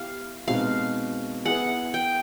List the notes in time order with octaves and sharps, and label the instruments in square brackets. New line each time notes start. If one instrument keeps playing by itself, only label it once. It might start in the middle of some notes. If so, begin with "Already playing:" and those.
Already playing: [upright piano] B3 E4 G4 [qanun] F5
[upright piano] B2 G#3 C4 D#4 [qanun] F5
[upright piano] B3 E4 G#4 [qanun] F#5
[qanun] G5